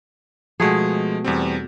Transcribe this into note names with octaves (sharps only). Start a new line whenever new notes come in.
B2 F3 G#3 A3 G#4
E2 G3 C4